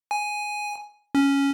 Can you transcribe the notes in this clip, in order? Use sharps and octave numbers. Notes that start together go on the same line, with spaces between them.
G#5
C#4